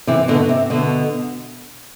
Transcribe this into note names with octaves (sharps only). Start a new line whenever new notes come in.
C3 E3
B2 D3
C3
B2 D3